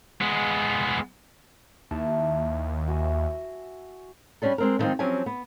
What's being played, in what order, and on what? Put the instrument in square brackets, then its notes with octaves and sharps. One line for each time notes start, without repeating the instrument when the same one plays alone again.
[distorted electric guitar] G#3 B3
[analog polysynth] D#2 [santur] E4 A5
[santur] F#4 E5 G#5
[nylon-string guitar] G3 B3 C#4 D4 A4
G#3 C4 A#4
D3 D#3 F3 G#3 C4 D#4
F3 F#3 C4 C#4 G4 G#5
B3